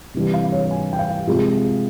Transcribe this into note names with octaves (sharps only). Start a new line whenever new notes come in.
C3 E3 G3
F5
C#5
G#5
G5
F5
C3 F3 G#3